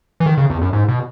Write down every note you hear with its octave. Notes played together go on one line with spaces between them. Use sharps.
E3
D#3
C#3
E2
F#2
G#2
B2